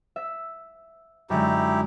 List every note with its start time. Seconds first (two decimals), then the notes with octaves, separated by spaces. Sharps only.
0.16 E5
1.30 F#2 D3 G#3 D#4 E4 G4